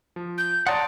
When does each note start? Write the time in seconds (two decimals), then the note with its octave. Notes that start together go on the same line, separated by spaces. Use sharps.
0.16 F3
0.37 G6
0.67 C#5 D5 F#5 A5 A#5 C6 D#6